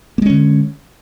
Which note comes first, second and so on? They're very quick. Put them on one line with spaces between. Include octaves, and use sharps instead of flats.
A#3 G#3 C#4 D3